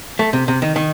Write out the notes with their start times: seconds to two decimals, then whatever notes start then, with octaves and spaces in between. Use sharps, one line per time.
0.19 A3
0.33 C3
0.48 C3
0.62 D#3
0.76 D#3